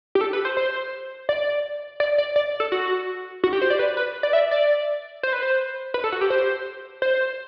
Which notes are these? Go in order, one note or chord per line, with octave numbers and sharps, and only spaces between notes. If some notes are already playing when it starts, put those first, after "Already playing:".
G4
A4
B4
C5
C5
D5
D5
D5
D5
A4
F#4
F#4
G4
C5
D5
B4
B4
D5
E5
D5
C5
B4
C5
B4
A4
F#4
G4
C5
C5